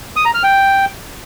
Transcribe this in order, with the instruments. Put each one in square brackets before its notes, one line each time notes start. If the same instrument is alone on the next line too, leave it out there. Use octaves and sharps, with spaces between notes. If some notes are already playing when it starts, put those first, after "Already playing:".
[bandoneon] D#6
A#5
F6
G5